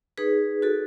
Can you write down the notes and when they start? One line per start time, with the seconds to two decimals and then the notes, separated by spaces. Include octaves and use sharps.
0.18 D#4 G#4 B4
0.62 F#4 A4